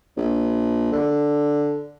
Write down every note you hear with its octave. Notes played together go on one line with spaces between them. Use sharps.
A#1
D3